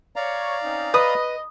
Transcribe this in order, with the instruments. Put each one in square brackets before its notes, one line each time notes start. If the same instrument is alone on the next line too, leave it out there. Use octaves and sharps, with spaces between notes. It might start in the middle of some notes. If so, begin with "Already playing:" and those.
[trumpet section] C#5 [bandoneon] D5 F5 A#5
[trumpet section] C4 C#4 D#4
[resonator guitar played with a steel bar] B4 [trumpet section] D#5 [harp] D#6